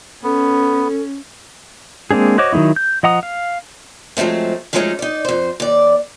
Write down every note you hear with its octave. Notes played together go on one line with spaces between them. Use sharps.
B3 C#4 A4
G#3 A#3 C4 D4 G#4
F#4 C5 C#5 D#5 D6
D#3 F#3 A3 D#4 E4
G6
F3 D#5 F#5 A#5 D#6
F5
F3 F#3 G#3 A3 C4
F3 F#3 G#3 A3 C#4 D#4
D#4 D5
F2 C5
D#2 D5